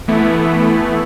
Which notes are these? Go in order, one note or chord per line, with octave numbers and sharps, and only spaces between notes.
E3 A3 B3 E4